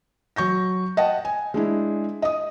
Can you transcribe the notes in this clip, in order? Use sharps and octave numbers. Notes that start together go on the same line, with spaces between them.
F#3 C#6 G6 A#6
D#5 F#5 G5 A5
G#5
G#3 D4 E4
D#5 D#6